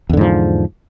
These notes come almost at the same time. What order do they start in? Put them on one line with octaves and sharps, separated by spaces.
E2 D3 G#2 F3